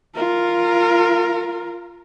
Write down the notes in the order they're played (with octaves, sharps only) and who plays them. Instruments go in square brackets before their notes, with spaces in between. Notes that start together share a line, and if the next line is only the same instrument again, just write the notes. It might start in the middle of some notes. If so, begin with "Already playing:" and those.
[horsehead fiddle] F4 A#4